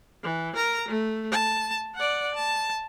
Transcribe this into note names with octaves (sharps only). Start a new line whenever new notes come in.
E3
A#4 A#5
A3
A5
D5 F#5
A5